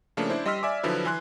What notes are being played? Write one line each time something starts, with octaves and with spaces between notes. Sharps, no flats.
C#3 F3 A3 A#3 C#4 D4
D4 E4 C5
G3 D#5 C6 E6 F6 B6
D5 E5 G#5 D6
D3 F3 F#3 E4 B4
E3 G#5 C6 F#6